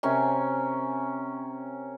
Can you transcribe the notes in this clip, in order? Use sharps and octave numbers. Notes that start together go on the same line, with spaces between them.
C3 C#4 A#4 G#5